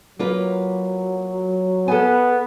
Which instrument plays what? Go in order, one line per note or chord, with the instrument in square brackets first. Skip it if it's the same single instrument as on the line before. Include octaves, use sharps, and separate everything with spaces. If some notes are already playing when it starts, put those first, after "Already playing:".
[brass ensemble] F#3 [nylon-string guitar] A#3 F4 B4
[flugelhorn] B3 [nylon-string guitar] A4 G#5